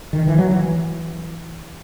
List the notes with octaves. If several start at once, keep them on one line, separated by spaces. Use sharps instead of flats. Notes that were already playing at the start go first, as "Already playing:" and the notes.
D#3
E3
F#3
E3